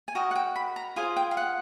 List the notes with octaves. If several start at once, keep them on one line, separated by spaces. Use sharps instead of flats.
G#5
F#4 A#4 D#5 G5
F#5
G5
B5
A#5
F4 G#4 C5 G#5
G5
F5
F#5